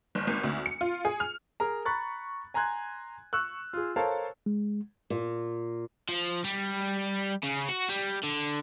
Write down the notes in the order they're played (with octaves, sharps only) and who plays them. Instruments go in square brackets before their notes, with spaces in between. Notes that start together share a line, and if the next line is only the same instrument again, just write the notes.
[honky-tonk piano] G1
G#1
D2
C#7
F4
G#4
F6
[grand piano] G#4 A#4 A#5
A#5 B5 C#6 F#6 A6
G#5 A#5 C6 F#6 G#6
C#6 E6 F#6
F4 G#4
A4 A#4 C5 C#5 F5 A5
[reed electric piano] G#3
[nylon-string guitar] A#2
[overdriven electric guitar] F3
G3
C#3
F#4
G3
D3